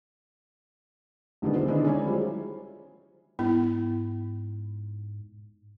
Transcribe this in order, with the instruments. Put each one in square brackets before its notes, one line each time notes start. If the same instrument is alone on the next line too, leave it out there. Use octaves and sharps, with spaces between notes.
[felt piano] C2 D3 D#3 G#3 B3
D4 F4 C5
D3 D#3 G#3 B3 D4 E4
C#4 E4 C#5 D5 G#5
F#3 G3 E4 F4 G#4 C5
[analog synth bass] G#2 [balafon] B3 E4